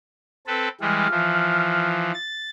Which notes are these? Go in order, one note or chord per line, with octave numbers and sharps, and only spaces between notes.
C4 A4 B4
E3 G3 G#3 F6
E3 F3
A6